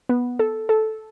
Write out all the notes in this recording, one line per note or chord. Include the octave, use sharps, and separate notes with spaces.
B3
A4
A4